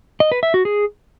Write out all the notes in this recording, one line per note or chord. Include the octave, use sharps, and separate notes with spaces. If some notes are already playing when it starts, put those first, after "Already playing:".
D#5
B4
E5
F#4
G#4